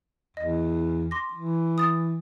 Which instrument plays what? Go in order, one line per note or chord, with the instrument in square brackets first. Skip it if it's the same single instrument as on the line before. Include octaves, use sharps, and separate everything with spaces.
[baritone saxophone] E2 [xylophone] D#5
[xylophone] C6 D6 A#6
[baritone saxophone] E3
[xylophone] D#6 A6